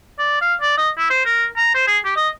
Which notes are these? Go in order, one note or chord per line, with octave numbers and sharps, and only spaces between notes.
D5
F5
D5
D#5
E4
C5
A#4
A#5
C5
G#4
G4
D#5